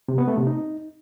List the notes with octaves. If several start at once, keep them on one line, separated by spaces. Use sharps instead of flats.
C3
B3
A3
C3
D#4